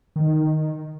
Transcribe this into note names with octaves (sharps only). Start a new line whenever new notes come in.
D#3